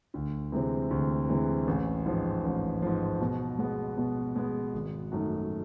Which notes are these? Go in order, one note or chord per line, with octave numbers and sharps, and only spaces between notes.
D2
C3 E3 G#3 C4
D2
C3 E3 G#3 C4
A1
G#2 F3
A1
G#2 F3
B2
G#3 B3
B2
G#3 B3
G#1
F#2 D#3 F#3 A3